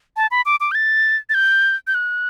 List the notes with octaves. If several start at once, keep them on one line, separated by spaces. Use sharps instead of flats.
A5
B5
D6
D6
G6
A6
A6
G6
G6
F#6